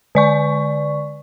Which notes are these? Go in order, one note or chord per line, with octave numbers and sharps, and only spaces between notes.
D3 D5 C#6